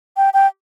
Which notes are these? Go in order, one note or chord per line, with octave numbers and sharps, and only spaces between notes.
G5
G5